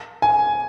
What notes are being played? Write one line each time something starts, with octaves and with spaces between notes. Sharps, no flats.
G#5